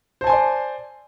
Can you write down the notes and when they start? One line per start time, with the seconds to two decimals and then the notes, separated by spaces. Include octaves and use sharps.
0.21 C5
0.24 A5
0.27 G#5
0.30 C6
0.33 D5